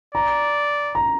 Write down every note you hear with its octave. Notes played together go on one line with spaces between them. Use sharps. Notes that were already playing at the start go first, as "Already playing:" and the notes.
D5 A#5
A#5